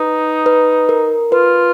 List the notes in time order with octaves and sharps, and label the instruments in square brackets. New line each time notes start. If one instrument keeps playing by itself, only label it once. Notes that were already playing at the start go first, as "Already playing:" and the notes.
Already playing: [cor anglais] D#4 [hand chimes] B4
[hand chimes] B4
A#4
[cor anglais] F4 [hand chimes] B4